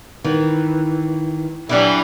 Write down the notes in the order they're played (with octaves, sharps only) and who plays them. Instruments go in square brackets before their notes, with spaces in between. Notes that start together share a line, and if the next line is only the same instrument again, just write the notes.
[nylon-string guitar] D#3 [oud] E3
[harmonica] E3 G3 [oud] F#3 D4 E4